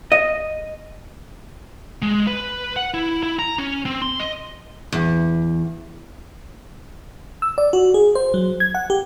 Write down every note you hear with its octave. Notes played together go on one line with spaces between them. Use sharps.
D#5
G#3
B4
F#5
E4
E4
A#5
C#4
C4
C6
D#5
E2
E6
D5
F#4
G#4
C5
F#3
G#6
F#5
G4